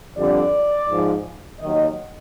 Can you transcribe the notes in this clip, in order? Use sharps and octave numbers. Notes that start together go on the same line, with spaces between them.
F2 D3 G3 D5
G#2 F3
D#2 D#3 F#3 D#5